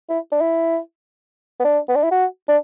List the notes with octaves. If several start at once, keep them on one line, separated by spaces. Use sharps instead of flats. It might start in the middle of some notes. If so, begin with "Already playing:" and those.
E4
D4
E4
B3
D4
B3
D4
E4
F#4
D4